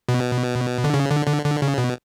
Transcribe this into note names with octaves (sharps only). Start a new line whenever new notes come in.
B2
D3
C#3
D3
D3
D3
C#3
B2